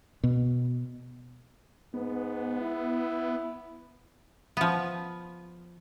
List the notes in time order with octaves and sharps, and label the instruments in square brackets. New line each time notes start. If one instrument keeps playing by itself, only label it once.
[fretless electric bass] B2
[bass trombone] G#2 [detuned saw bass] B3
[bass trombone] E4
[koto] F3 B3